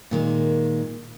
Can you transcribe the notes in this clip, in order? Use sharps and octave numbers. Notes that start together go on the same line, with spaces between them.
A#2 D#3 G#3